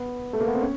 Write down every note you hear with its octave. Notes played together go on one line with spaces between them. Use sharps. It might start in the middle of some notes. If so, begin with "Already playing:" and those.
Already playing: B3
A3
A#3
B3
C4
C#4